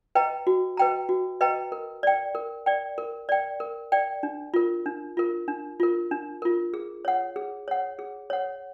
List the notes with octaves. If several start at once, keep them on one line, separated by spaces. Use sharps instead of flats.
B4 D#5 G5 A#5
F#4
B4 D#5 G5 A#5
F#4
B4 D#5 G5 A#5
A#4
D5 G5
A#4
D5 G5
A#4
D5 G5
A#4
D5 G5
D4
F4 A#4
D4
F4 A#4
D4
F4 A#4
D4
F4 A#4
G#4
C#5 F#5
G#4
C#5 F#5
G#4
C#5 F#5